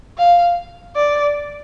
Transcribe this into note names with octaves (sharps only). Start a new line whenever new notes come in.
F5
D5